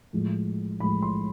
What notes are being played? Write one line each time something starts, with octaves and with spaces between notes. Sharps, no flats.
A2 F3 G#3
A2 F3 G#3 B5
C6